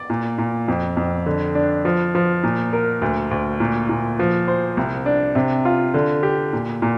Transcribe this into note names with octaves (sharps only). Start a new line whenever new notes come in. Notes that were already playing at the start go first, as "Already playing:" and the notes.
Already playing: D5
A#2
A#2
F2
F2
D3
D4
F3
F3
A#2
A#4
D2
D2
A#2
A#2
F3
C5
C2
D4
C3
F4
D3
G4
A#2
A#2